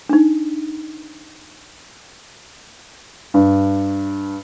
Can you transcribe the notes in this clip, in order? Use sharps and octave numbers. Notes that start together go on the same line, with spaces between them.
D4 D#4
G2